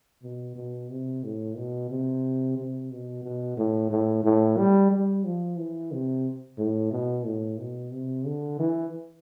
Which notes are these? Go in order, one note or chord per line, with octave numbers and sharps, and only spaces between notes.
B2
B2
C3
A2
B2
C3
C3
B2
B2
A2
A2
A2
G3
G3
F3
E3
C3
A2
B2
A2
B2
C3
D3
E3